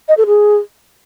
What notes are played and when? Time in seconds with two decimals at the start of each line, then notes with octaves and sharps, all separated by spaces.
0.08 D#5
0.17 A4
0.27 G#4